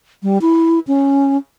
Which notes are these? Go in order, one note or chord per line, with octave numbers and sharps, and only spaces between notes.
G3
E4
C#4